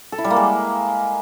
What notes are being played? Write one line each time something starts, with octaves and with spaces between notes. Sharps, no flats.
A4
E4
G3
A#3
G#3